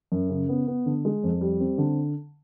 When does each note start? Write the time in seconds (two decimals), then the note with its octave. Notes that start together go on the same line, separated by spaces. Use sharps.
0.12 F#2
0.29 C#3
0.49 B3
0.67 B3
0.86 D3
1.05 G#3
1.23 F2
1.41 G3
1.60 C4
1.78 D3